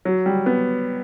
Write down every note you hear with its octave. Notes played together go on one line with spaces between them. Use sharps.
F#3
G3
B3